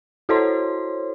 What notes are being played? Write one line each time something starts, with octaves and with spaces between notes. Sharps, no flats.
E4 F#4 A4 C5 C#5 C6